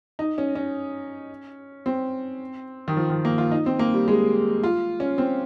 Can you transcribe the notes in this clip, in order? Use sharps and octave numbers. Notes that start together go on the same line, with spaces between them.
D#4
C#4
C#4
C4
D#3
F3
D#3
A#3
F4
D#4
C4
A#3
G3
G#3
F4
C#4
C4